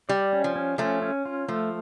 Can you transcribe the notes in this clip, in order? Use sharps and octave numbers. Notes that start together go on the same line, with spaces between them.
G3 D5
C#4
F3
C#4
F3 A3 C#4
C#4
F4
F3 A3